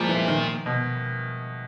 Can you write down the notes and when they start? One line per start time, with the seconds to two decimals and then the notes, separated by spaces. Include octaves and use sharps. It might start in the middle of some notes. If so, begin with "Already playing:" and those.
Already playing: A#2 F3 G3 G#3
0.09 E3
0.28 D#3
0.66 B2